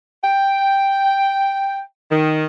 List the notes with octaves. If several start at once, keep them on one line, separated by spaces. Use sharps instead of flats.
G5
D#3